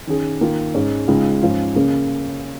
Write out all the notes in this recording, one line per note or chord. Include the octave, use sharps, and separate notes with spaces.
D#3 C#4 G#4
D#3 A#3 F4
G#2 G#3 C#4
C#2 C#3 G#3 D#4 G#4
G#2 F3 C#4 F4
C#3 A#3 C#4 G#4